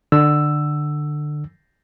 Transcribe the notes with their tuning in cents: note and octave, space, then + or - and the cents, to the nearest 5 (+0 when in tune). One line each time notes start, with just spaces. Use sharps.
D3 +20 E6 +5